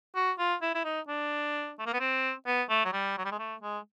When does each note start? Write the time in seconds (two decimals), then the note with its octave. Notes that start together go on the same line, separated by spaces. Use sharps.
0.15 F#4
0.38 F4
0.62 E4
0.75 E4
0.84 D#4
1.08 D4
1.79 A3
1.86 A#3
1.93 B3
2.00 C4
2.46 B3
2.69 A3
2.85 F#3
2.93 G3
3.18 F#3
3.25 G3
3.31 G#3
3.39 A3
3.62 G#3